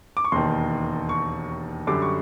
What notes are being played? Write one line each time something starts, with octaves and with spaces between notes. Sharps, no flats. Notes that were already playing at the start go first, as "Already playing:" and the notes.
D6
C#6
E1 D#2 D#3 C6
C#6
F#2 D3 G3 D6
C#6